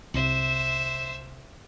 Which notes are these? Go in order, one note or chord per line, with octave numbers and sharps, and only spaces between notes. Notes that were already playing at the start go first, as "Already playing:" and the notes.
C2 C3 C5 E5